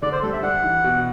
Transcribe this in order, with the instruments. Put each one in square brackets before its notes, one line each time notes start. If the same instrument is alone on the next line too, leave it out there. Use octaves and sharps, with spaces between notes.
[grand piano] D3 [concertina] D5
[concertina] C5
[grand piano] G3 [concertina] A4
[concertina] E5
[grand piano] D4 [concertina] F#5
[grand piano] E3
B2